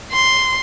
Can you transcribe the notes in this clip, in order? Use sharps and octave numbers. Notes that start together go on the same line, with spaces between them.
C6